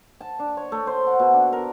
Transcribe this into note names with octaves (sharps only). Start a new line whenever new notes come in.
A5
D4
C#5
A3
C5
F#5
B2
D4
A#4